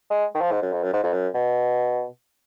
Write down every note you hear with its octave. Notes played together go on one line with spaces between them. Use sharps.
G#3
D#3
F3
G#2
F#2
F2
F#2
G#2
F2
F#2
B2